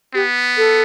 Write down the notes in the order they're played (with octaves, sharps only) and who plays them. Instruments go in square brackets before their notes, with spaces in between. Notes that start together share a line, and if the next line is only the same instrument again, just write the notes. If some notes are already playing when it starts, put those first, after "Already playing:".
[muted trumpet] B3 [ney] G4
[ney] A4